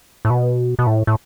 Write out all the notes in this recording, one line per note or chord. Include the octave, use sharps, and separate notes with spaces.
A2
B2
B2
A2
A2